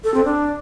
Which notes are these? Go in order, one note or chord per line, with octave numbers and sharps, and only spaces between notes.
A4
C4
D4